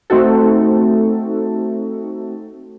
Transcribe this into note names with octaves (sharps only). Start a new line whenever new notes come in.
A3 C4 D#4 F#4 A4